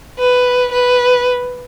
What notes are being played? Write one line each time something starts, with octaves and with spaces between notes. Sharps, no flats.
B4
B4